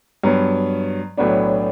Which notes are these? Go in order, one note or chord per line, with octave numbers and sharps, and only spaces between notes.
G2 F#3 B3
B1 A2 F#3 B3 D4